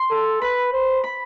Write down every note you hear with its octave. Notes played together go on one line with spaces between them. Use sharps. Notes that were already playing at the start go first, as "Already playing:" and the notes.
Already playing: C6
A4
B4 B5
C5
B5